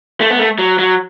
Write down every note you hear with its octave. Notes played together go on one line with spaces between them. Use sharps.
A3
B3
A3
F#3
F#3